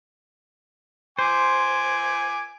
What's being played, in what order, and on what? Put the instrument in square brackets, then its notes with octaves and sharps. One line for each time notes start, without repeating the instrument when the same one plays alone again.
[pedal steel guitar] C5 [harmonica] G#5 D6